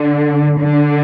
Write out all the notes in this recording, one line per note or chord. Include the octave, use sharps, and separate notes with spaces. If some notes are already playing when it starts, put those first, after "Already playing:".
Already playing: D3
D3